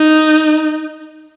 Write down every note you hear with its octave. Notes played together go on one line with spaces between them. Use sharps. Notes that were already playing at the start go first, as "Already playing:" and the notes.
Already playing: D#4